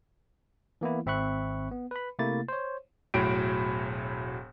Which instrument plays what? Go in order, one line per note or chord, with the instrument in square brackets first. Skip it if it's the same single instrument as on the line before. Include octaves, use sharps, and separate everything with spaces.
[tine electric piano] E3 A#3 B3 E4
G#1 C4 E5 B5 C#6 F#6
B3
B4 B5
C3 A3 A#3 E4 A6
C5 C#5
[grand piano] E1 A2 F#3 D7